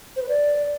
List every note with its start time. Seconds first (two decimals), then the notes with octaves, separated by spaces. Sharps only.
0.16 C5
0.22 B4
0.28 D5